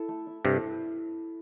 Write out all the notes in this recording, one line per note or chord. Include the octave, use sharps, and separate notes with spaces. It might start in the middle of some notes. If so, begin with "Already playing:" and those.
Already playing: E4 A4 E5
A3
E4
G2 C3 A4